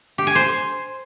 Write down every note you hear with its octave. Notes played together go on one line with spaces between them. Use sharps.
G4
G#5
C5